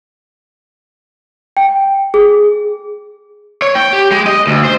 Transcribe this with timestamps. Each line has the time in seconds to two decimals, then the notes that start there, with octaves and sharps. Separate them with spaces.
1.57 G5
2.14 G#4
3.62 C#5
3.75 G5
3.93 G4
4.12 G#3
4.27 D#5
4.47 D2
4.65 C5